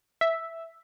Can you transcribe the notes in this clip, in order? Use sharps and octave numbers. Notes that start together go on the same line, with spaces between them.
E5